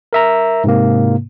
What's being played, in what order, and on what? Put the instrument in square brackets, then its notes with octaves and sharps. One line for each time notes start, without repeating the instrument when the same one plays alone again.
[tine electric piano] A#4 E5 A#5
G#2 C3 A#3